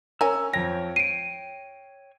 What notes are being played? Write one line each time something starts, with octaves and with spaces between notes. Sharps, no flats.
C#4 A#4 G#5 E6
F2 C#5 G5 A#6
C7 D7 D#7